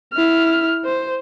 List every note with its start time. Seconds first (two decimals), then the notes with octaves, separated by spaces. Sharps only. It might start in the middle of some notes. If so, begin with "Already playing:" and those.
0.13 E4 F6
0.85 C5